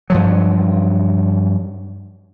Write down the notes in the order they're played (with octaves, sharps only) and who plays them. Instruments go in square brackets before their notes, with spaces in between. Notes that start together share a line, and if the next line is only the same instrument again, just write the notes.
[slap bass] G2 F3 F#3